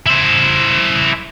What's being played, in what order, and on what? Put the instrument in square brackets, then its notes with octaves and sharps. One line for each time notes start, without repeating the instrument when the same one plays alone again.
[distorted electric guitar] E4 C5